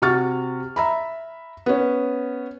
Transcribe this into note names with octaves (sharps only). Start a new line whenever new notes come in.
C3 F#4 C#6 F6 A6
E5 A#5 B5
B3 C#4